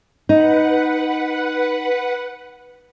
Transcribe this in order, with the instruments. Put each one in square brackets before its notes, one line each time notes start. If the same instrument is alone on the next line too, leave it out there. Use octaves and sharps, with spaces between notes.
[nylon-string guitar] D#4 [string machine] B4 F#5